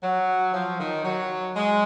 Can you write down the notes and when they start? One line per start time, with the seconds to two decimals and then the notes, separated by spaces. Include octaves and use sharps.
0.03 F#3
0.54 F3
0.80 D#3
1.05 F#3
1.56 G#3